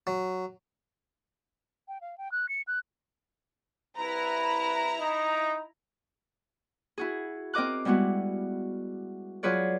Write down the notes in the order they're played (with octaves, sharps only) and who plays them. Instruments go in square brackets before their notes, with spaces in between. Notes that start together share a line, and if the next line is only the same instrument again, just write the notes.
[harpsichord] F#3
[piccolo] G5
F5
G5
F#6
C#7
F#6
[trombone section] C2 B4 [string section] E4 A#5
[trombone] D#4
[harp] E4 F#4 G#4
C4 A#4 D#5 D6 F#6
G3 G#3 B3 E4 F#4
F#3 F4 G#4 B4 C#5 D5